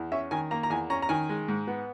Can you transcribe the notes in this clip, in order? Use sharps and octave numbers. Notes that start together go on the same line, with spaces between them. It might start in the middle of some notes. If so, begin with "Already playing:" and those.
Already playing: E2
C#4 E5
D#3 G#5
A#3 A#5
A#5
E2 G#5
C#4 A#5
A#5
D#3 G#5
G#3
G#2
B3